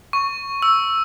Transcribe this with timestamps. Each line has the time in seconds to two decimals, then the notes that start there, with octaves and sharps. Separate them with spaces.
0.13 C#6
0.62 E6